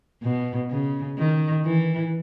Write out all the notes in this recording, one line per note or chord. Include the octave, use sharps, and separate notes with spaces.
B2
C#3
D#3
E3